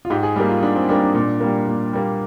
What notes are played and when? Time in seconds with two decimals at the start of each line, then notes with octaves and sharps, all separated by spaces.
0.05 F4
0.10 G#2 G4
0.23 G#4
0.36 G3 G4
0.40 A#3
0.49 F4
0.63 G#2 D4
0.76 C4
0.89 G3 A#3 D4
1.02 D4
1.15 A#2
1.41 G3 A#3
1.67 A#2
1.93 G3 A#3